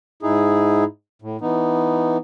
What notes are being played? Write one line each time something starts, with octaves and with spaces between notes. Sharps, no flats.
G#2 D#4 E4 G#4
A2
E3 B3 D#4